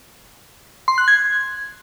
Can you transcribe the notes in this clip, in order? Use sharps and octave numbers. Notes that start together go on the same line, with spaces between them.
C6
F#6
G#6